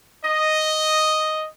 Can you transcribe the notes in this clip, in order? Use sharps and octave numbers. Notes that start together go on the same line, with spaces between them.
D#5